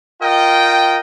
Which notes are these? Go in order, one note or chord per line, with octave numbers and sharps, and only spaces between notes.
F4 A#4 D#5 G5